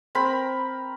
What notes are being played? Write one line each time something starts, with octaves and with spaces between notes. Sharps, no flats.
C4 A#4 B5